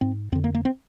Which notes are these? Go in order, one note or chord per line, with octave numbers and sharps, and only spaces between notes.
G#2 C4
F2 D3 C4
A#3
A#3
C4